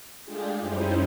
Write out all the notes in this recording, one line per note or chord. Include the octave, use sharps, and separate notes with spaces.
G#3 A3 D4 F4 G4 G#4
F#2 G3 C#4 D#4 E4 C5